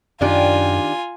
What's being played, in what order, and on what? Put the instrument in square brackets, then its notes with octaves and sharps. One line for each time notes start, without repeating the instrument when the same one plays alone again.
[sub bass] F#2 [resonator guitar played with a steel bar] D#3 D4 G4 [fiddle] F4 G#5